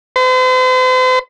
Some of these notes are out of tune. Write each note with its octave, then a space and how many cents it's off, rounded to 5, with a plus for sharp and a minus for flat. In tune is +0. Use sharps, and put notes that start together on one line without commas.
C5 -45